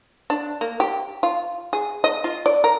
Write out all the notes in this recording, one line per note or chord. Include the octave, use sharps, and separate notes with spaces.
D4
A#3
G4
F4
G#4
D#5
F4
D5
A#4